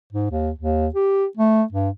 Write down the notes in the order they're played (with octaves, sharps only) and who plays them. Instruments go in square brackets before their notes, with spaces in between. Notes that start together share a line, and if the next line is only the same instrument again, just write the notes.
[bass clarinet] G#2
D#2
D#2
G4
A3
G2